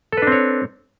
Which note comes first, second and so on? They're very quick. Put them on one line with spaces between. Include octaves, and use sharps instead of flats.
A4 B4 D4 C4 C#5